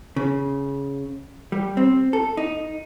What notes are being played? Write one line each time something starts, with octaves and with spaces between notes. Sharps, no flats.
C#3
G3
C4
A4
D#4